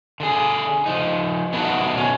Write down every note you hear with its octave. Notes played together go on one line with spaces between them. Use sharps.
D3 G#4
F3 D#4
A3 B3 D4 D#4 F#4
B2 C#4